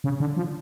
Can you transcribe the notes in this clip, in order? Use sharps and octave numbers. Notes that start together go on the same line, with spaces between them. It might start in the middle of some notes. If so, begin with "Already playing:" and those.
C#3
D3
F3